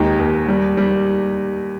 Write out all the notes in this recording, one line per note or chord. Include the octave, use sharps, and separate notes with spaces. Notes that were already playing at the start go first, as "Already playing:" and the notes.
Already playing: D#2 G#3 D#4 G4
D#2
G3
G3